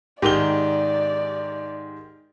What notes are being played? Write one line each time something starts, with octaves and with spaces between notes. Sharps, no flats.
G#2 D#3 G4 D5 G7